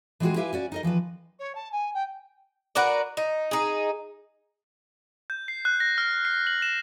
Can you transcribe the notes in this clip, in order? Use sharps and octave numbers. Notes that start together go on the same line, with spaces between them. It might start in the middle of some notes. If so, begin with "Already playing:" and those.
E3 G#3 C4 D#4 F#4 G#4
E4 G4 B4 E5 F5 G#5
C#4 F#4 D5
D#4 A#4 D#5
E3 F3 C4 B4
C#5
A5
G#5
G5
F#4 A#4 B4 D5
D#4
D#4 G#4
G6
C7
F#6
A#6
F6
C7
F#7
E7